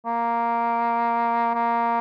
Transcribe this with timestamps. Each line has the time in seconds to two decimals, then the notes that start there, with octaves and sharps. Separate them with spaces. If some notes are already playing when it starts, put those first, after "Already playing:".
0.05 A#3
1.54 A#3